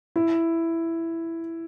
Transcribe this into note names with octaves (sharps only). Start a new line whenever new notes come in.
E4